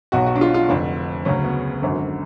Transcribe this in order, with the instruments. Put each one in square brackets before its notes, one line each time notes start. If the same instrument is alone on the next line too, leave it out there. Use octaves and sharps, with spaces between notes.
[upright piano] B1 B2 F#3 F#4
F#4
D4
F4
F4
F1 F2 D3 D4
D2 C#3 F#3 C#4
B3
G#1 F#2 D3